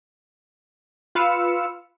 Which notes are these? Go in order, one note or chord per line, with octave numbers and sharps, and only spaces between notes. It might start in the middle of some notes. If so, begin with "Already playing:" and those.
F4 B4 F5 E6 C#7